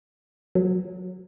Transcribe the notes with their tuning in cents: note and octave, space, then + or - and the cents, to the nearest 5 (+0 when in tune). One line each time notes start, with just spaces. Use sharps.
F#3 -15